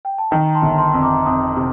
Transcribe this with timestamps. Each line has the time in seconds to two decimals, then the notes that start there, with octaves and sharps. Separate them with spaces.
0.05 G5
0.18 A5
0.31 D#3 G5 A#5
0.55 A5 C6
0.62 G1
0.78 A5 C6
0.94 F2
1.02 A#5 D6
1.25 F2 C6 D#6
1.57 C3